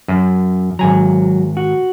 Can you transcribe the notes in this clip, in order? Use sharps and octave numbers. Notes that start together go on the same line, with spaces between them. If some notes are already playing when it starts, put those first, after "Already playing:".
F#2
G#1 F#3 G#5 A#5
F#4